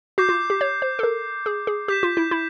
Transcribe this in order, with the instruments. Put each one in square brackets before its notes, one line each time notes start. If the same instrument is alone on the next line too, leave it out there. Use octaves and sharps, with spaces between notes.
[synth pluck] F#4 [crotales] D6 G6 C7
[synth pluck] F4
G4
C#5
C5
A4
A#4
G#4
G#4
[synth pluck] G4 [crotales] G6 B6 E7
[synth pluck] F4
E4
E4